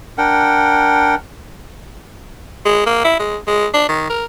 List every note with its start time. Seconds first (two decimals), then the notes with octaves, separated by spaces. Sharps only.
0.18 D4 A#4 F#5 G5
2.66 G#3
2.86 A#3
3.04 E4
3.19 G#3
3.47 G#3
3.74 D4
3.89 D#3
4.10 A#4